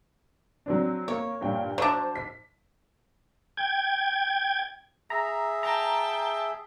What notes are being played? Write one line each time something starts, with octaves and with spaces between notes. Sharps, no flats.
F#3 C4 D4
A#3 C#5
G2 A#2 G5
F#3 D4 C5
B6
G5 G#6
G#4 E5 A#5
G5 A5 A#5